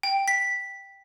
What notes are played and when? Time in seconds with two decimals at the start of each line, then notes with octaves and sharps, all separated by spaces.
0.03 G5
0.28 B6